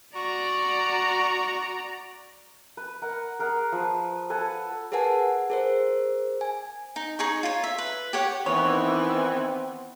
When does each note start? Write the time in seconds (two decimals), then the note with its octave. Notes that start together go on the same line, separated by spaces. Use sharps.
0.15 F#4 D5 A#5
2.77 B4
3.02 A#4 F#5
3.39 G#4 A#4 F#5
3.72 F3 B4
4.30 A4 B4 F#5 G#5
4.92 G#4 A#4 B4 F#5 G#5 A5
5.50 G#4 A#4 C5
6.41 G#5
6.96 D#4
7.19 D#4 G#4 C#6
7.43 F4 C#5
7.64 E5
7.78 B4
8.13 G4 C#5 F#5
8.46 D#3 E3 B3 C4 C#5